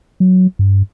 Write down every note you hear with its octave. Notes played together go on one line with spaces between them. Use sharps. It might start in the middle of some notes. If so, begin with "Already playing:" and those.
F#3
G2